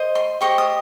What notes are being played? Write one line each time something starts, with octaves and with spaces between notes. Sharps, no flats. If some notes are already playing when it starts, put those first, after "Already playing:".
Already playing: C5 D#5
C6
G4 C5 D#5 C#6
D#6